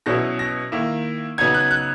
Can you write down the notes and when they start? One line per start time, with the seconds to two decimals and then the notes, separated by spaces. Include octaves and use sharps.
0.06 B2 F#3 C#4 E4 A#6
0.39 A#6
0.72 D#3 A#3 E4
1.38 C#3 F#3 B3 D#4 G#6
1.54 F#6
1.71 F#6